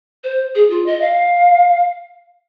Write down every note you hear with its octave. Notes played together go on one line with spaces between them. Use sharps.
C5
G#4
F4
D#5
F5